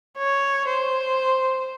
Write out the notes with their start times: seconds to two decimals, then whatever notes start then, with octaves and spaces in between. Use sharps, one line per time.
0.18 C#5
0.68 C5